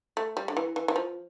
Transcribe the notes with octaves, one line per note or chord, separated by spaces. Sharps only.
A3
G3
D3
E3
E3
E3
F3